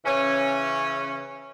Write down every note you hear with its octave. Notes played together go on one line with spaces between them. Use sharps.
C#3 E3 C#4